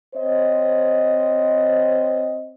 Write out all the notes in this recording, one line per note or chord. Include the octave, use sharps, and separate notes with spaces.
C4 C5 C#5 D#5